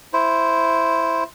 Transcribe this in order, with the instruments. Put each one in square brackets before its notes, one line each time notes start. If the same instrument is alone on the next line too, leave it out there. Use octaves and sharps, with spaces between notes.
[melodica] E4 C5